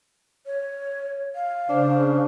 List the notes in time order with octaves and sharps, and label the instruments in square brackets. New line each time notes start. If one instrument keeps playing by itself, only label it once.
[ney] C#5
F5
[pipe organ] C#3 [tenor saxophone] D4 [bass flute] C5